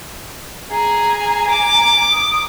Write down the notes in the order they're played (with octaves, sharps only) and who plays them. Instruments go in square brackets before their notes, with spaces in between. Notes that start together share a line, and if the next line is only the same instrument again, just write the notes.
[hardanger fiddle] G#4 [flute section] G#5 A#5
[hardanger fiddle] D6
[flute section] D#6